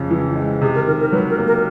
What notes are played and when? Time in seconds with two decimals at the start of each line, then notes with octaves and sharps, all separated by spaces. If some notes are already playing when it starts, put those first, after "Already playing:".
Already playing: F2 C#3
0.11 E3
0.36 G#3
0.62 C3 G#4
0.75 A#4
0.87 D#3 A#4
1.00 A#4
1.13 F#3 B4
1.30 A#4
1.38 A#3
1.47 A#4